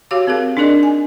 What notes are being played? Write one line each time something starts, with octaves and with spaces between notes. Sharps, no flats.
F#4 G4 C#5 F5 D6
C4 G#4 A#4 F5
D4 D#4 G#4 A#4 D5 D#5
G#5